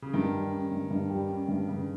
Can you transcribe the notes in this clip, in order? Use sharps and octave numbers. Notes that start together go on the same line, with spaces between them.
C#3
G2 D#3
G3
C#4
G2
G2
G3
C#4
G2
G2 C#3